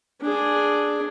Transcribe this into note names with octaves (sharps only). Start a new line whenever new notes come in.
D4 G#4